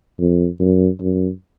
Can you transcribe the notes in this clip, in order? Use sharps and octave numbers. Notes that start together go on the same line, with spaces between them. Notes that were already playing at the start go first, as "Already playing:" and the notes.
F2
F#2
F#2